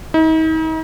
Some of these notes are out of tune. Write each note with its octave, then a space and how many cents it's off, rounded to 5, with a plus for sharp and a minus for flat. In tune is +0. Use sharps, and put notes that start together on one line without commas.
D#4 +40